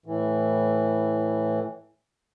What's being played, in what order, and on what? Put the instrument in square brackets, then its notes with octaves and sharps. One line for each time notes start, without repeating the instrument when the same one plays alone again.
[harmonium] A2 E3